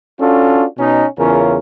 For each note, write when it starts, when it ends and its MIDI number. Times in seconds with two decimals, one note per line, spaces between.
0.20 0.64 61
0.20 0.64 62
0.20 0.64 65
0.20 0.64 66
0.20 0.64 69
0.78 1.04 47
0.78 1.04 61
0.78 1.04 63
1.18 1.58 40
1.18 1.58 49
1.18 1.58 61
1.18 1.58 65
1.18 1.58 70